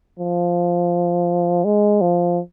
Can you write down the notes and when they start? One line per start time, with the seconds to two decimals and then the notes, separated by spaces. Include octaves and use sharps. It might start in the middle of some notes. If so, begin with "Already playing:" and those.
0.19 F3
1.65 G#3
2.01 F3